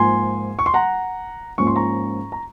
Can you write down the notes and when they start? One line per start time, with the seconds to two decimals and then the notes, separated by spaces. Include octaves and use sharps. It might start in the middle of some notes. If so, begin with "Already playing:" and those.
Already playing: G#2 F3 A#3 G#5 C6
0.59 C#6
0.66 C6
0.74 F#5 A#5
1.58 G#2 F3 A#3 C#4 C#6
1.67 C6
1.76 A#5 C#6
2.32 A#5